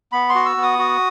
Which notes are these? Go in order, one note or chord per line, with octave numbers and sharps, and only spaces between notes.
B3 B5
C6
F#4
E6
B3
D#6
F#4